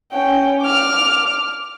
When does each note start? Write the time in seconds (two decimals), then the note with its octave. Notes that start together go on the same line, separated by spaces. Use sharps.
0.13 C#4 G5
0.62 D6 F6